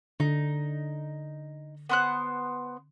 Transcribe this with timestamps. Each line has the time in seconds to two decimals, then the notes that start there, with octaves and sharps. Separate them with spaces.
0.20 D3 D#4
1.89 B3 C5 F#6